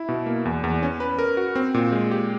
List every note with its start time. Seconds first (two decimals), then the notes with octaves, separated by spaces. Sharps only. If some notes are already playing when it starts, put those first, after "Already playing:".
Already playing: E4
0.09 B2
0.26 A#3
0.45 E2
0.64 E2
0.83 C#4
1.00 B4
1.19 A#4
1.37 F#4
1.55 C4
1.74 A#2
1.92 G#3
2.11 G4